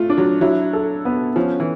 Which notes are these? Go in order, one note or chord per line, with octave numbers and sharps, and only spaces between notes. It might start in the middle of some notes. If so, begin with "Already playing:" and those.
Already playing: A3 F4
D4
F#3
F#3 E4
A4
B3
F3 C#4
E3